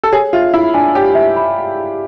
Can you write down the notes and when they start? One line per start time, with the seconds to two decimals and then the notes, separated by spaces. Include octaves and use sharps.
0.03 A4
0.12 G#4 C#5
0.33 F4 E5
0.54 E4 B5
0.74 D4 G#5
0.94 G4 C#5
1.15 E5
1.36 B5